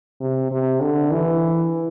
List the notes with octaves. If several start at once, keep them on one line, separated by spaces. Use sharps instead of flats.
C3
C3
D3
E3